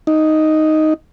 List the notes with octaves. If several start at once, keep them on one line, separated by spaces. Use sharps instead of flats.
D#4